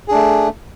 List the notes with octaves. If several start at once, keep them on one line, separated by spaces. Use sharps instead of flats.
A3 D4 G#4